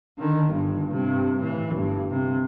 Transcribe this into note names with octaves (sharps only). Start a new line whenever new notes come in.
D3 D#3
G1 G2
G2 C3
A2 E3
G1 G2
C3